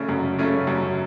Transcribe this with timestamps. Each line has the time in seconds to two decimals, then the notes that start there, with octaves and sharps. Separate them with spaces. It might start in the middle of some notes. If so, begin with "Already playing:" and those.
Already playing: C#3 A3 C#4
0.09 F#2
0.38 C#3 A3 C#4
0.67 F#2